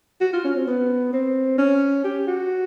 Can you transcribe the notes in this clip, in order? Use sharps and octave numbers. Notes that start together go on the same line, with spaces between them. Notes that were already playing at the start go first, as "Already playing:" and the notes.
F#4
F4
C#4
C4
B3
C4
C#4
G4
F#4